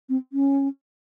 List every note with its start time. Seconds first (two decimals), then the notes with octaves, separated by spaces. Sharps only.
0.09 C4
0.33 C#4